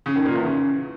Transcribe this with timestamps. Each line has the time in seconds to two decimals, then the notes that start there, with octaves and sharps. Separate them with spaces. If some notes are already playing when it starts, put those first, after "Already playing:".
0.06 C#3
0.16 D#3
0.25 A#2
0.35 E2
0.45 C#3